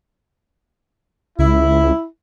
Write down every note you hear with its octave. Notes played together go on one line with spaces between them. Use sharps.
C#2 E4